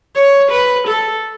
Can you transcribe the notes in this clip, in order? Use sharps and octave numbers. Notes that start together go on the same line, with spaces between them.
C#5
B4
A4